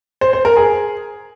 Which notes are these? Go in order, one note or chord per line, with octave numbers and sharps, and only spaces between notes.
C5
C5
A#4
G#4